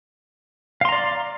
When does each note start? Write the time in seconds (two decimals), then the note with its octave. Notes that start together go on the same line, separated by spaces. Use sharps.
0.81 F5
0.85 C6
0.89 A#5
0.92 D5